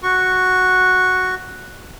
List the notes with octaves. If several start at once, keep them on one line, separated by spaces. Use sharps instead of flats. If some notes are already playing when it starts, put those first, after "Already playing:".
F#4 C#6